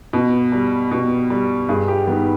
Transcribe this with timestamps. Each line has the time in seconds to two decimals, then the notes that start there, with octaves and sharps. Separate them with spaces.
0.13 B2
0.52 G3
0.91 B2
1.30 G3
1.69 G2 G#4
1.88 G4
2.07 D#3 G3 B3